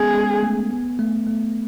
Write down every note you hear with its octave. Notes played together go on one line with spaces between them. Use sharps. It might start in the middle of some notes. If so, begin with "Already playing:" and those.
Already playing: G#3 B3 C#4 G#4 A4
G#3
A3
B3
A3
A3